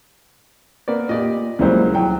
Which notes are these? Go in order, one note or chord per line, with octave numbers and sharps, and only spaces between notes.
A#3 B3 D5
A#2 G4 D5 D#5
C#2 E3 F#3 G3 A#3 C5
A2 F#3 G5